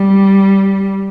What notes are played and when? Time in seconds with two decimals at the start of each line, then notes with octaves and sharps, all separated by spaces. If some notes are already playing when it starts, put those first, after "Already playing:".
Already playing: G3